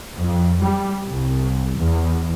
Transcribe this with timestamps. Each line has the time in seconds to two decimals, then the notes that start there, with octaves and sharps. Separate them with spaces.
0.17 F2
0.61 G3
1.06 C2
1.77 E2